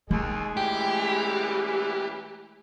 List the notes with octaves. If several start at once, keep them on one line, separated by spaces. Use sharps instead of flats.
D#2 G#3 A3 G#4
F#2 A#2 E3 G4